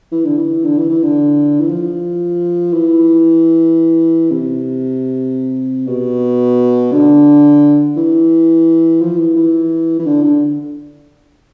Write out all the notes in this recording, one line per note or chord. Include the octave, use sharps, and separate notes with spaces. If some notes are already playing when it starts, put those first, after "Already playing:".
E3
D3
E3
D3
E3
E3
D3
E3
F3
E3
C3
B2
D3
E3
F3
E3
E3
E3
D3
D3